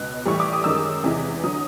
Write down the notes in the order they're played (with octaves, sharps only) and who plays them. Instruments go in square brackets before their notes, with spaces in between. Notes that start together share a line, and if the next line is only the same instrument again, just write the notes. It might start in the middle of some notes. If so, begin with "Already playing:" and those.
Already playing: [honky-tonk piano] C#2 B2 F#6
A2 E3 G3 C#6
D6
D#6
F#2 D#3 G#3 E6
E2 C3 E3 G#3
D3 F#3 D#6